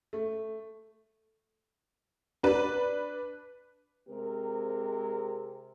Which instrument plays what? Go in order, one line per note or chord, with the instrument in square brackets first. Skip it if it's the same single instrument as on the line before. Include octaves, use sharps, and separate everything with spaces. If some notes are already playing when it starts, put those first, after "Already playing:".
[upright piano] A3
[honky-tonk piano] D4 B4
[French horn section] C3 G#3 C4 G4 A#4